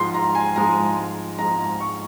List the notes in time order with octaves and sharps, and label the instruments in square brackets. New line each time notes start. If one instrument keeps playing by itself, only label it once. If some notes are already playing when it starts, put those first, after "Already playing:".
Already playing: [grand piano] G#2 F3 G#3 C6
A#5
G#5
G#2 F3 G#3 A#5
G#2 F3 G#3 A#5
C#6